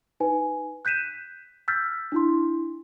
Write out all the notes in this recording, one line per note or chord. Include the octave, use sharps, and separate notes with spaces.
D#4 B4 G#5
F#6 G6 B6 D#7 E7
E6 F6 G6 A6 B6
D4 E4 C6